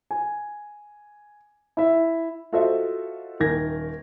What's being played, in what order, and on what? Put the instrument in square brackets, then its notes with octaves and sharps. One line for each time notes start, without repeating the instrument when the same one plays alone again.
[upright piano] G#5
E4 E5
F4 F#4 A4 C5 D#5 E5
D#1 D#3 A#4 G#6 A#6